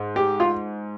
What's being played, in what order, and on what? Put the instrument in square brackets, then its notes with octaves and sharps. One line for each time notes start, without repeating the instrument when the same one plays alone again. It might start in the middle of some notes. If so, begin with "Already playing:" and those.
Already playing: [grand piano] G#2
[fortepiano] G4
F4